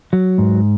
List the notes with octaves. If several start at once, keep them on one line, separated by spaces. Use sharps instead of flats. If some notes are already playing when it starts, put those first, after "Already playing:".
F#3
G#2